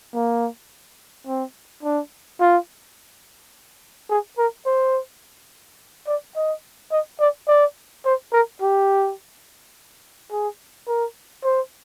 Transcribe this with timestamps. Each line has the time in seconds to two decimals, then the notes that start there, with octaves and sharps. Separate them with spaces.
0.14 A#3
1.27 C4
1.83 D4
2.41 F4
4.10 G#4
4.38 A#4
4.66 C5
6.07 D5
6.36 D#5
6.91 D#5
7.20 D5
7.48 D5
8.06 C5
8.33 A#4
8.62 G4
10.31 G#4
10.88 A#4
11.44 C5